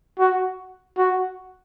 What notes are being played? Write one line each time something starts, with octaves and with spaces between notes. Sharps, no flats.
F#4
F#4